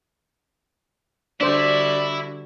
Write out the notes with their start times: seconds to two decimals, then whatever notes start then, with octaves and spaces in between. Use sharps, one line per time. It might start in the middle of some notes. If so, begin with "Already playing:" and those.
1.41 D3 G3 D4 E4 F#4 C5 D5